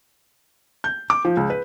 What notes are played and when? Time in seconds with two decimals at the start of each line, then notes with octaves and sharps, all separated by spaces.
0.84 G6
1.10 D6
1.25 F3
1.37 C#2
1.50 B4